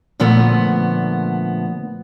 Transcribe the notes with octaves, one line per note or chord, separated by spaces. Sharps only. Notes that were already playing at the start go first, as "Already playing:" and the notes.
A#2 D3 F3 A3 B3